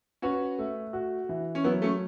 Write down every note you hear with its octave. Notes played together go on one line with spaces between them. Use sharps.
C#4 F#4 B4
A3
F#4
E3
C#4
F#3 B3 E4
A3 C#4